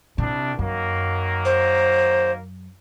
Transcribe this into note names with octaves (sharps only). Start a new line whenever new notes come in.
C2 C3 D4
F#2 D#3 F#3 A#3
C5